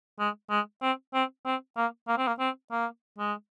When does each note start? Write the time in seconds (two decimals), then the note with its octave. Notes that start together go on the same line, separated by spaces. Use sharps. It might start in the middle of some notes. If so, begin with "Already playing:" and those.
0.19 G#3
0.50 G#3
0.82 C4
1.14 C4
1.46 C4
1.77 A#3
2.08 A#3
2.18 C4
2.28 A#3
2.40 C4
2.71 A#3
3.19 G#3